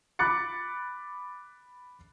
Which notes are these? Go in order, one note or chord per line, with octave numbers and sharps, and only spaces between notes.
B5 D6 F#6 A6 C#7